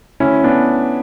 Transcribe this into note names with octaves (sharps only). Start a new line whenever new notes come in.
D2 C#4 E4
B3 D4